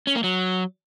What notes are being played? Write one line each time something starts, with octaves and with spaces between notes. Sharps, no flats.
C#4
A#3
F#3